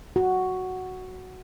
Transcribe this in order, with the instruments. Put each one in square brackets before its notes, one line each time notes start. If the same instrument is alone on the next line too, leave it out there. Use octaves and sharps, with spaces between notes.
[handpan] F#4